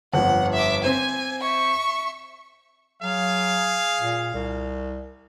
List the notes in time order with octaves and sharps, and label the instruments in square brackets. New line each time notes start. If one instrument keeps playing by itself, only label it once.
[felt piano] G1 F2 [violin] F#5
[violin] E5 D6
[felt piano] C4 C5 [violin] G#5
[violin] E5 C#6
[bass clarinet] F#3 [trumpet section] G#4 F5
[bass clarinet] A#2
C2